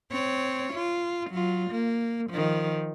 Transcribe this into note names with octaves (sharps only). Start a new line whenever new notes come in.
C4 C#5
F4
F#3 F4
A#3
D#3 F3